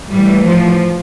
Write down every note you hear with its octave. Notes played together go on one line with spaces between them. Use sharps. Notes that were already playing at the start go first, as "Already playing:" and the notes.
A2 E3 G3
F3